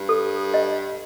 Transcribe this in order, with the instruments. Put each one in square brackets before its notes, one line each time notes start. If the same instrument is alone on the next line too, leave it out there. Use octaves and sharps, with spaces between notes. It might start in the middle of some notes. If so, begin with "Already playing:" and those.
Already playing: [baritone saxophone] G2
[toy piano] A4
D#5